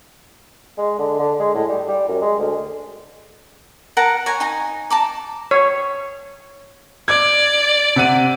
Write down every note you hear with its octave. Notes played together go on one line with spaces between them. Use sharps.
G#3
D3
D3
G#3
A2
G3
G3
F#2
G#3
D2
A#4 F#5 A5 A#5
C#5 G#5 A#5
D#4 G#5 A#5
A5 A#5 D6
C#5
D5 D6 G#6
C3 F#5 D#7